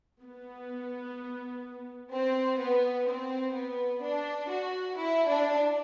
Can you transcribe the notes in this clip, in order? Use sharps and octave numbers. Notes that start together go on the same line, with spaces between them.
B3
C4
B3
C4
B3
D4
F#4
E4
D4